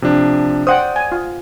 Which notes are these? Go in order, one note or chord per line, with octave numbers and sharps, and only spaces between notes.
C3 F3 D4
C5 D5 F#5 G5 D#6
G#5
F4